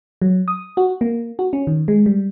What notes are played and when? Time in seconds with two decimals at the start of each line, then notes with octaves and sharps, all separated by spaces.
0.22 F#3
0.48 D#6
0.77 F#4
1.01 A#3
1.39 F#4
1.53 C#4
1.67 D#3
1.88 G#3
2.06 G3